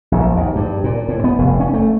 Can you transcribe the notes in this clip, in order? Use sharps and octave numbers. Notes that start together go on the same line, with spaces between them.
A#1
D#2
G2
A#2
A2
B3
F1
C#4
A3